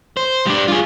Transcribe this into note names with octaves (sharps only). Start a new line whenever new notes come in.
C5
G3 D4
F4 G#4